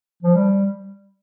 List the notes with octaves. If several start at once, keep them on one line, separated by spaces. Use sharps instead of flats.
F3
G3